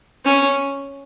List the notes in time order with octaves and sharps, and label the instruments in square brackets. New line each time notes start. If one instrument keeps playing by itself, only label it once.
[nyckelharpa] C#4